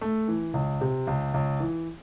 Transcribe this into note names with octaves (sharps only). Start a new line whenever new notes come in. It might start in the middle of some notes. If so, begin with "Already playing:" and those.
A3
E3
C#2
C3
C#2
C#2
E3